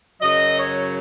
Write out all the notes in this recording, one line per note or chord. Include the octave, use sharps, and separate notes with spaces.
F#2 C#3 F#3 D#5
C#5